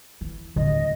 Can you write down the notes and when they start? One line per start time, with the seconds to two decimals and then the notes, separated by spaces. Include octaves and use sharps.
0.21 E3
0.56 D#1 C2 A2 D3 F#3 D#5